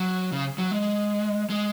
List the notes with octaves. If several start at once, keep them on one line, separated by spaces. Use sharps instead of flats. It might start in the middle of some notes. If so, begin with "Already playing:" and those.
Already playing: F#3
C#3
F#3
G#3
G#3